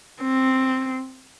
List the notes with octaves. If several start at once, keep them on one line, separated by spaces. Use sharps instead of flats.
C4